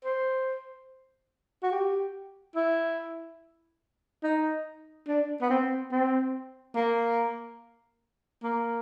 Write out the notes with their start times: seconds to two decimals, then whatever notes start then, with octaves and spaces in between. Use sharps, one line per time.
0.04 C5
1.63 F#4
1.72 G4
2.56 E4
4.23 D#4
5.08 D4
5.42 B3
5.50 C4
5.92 C4
6.75 A#3
8.43 A#3